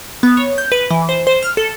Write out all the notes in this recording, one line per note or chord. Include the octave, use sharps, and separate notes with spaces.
B3
C#5
G6
B4
E3
C5
C5
F6
A4